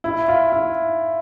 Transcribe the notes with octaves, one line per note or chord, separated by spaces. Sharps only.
E4
F4
E4